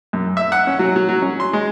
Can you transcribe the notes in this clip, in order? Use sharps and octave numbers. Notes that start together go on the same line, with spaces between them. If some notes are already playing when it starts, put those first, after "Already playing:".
F#2
E5
F#5
C#4
F#3
F#3
F#3
C#4
C6
G#3